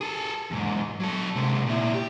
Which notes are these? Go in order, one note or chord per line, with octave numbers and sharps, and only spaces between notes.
G#4 A4
E2 G#2
F#3 A4
C3 G#3
A#2 E4
G4